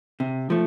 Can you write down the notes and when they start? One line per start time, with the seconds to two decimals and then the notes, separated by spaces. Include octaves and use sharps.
0.20 C3
0.50 F3 A3